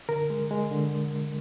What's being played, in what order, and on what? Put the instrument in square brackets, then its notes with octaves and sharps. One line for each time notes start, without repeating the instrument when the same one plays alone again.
[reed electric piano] D3 A#4
G#3
G#3
D3